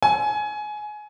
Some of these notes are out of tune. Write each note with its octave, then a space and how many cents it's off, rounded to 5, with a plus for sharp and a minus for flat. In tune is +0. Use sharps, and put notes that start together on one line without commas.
G#5 +20